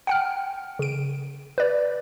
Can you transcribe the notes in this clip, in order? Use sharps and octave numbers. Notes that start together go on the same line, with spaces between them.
F#5 G5 F6
C#3 D7
B4 D5